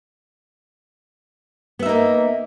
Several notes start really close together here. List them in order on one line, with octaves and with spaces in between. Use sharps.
B3 E5 D#4 A#3